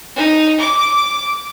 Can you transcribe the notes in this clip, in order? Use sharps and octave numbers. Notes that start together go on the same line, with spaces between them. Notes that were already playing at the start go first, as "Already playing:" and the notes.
D#4
D6